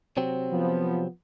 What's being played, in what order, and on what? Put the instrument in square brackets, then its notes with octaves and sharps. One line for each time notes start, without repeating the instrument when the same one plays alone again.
[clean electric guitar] C3 F#3 C4
[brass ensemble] F3 B3